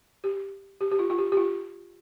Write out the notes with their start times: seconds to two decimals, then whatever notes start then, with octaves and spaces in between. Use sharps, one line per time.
0.24 G4
0.81 G4
0.91 G4
0.99 F4
1.10 F4
1.18 G4
1.32 G4
1.37 F4